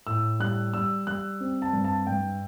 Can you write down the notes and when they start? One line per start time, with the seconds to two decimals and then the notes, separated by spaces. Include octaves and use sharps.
0.07 A2 E6
0.40 G3 F#6
0.74 G3 E6
1.07 G3 F#6
1.40 C4
1.62 A5
1.73 G2
1.84 A5
2.07 G2 G5